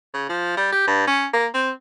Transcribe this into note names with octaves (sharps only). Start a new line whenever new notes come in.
C#3
F3
G3
G4
G2
C#4
A#3
C4